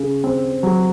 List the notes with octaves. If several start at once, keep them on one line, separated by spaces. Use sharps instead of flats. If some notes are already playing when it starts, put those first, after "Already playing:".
Already playing: C#3
C4
F#3